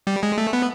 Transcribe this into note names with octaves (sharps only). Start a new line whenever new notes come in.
G3
G#3
A3
B3